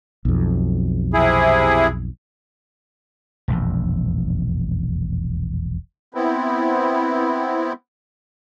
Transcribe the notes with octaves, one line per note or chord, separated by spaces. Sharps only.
B1 F2
C3 E4 G#4
E1 A#1 F2
B3 C4 E4